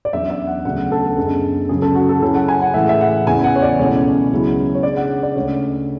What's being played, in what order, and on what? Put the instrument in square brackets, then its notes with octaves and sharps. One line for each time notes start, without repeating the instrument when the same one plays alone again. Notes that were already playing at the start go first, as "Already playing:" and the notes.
[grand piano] D5
E2 D3 F#3 C#4 E5
E5
F#5
D2 C#3 F#3 B3 D4 F#5
A4
F#2 D3 G#3 B3
F#2 C#3 F#3 G#4
A4
F#4
A4
C#3 F#3 C#4 E4 A4
F#5
G#5
F#5
A2 E3 G#3 E5
E5
F#5
E2 C#3 E3 G#5
F#5
C#5
D5
C#2 B2 A3 C#4 E4 C#5
C#2 C#3 F#3 B3 E4
C#5
C#3 G#3 D4 D5
F#5
D5
D2 C#3 G#3 C#5